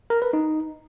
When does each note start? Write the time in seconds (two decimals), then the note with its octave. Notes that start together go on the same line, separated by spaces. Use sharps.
0.10 A#4
0.22 B4
0.33 D#4